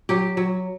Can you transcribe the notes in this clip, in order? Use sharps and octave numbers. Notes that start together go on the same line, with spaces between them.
F#3 G4
F#3